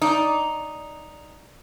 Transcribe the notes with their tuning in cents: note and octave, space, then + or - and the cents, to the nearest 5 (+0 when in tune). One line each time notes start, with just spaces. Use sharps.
D#4 +0 D5 -10